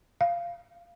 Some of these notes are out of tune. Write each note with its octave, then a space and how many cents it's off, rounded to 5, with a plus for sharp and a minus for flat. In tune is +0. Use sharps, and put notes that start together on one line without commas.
F5 -20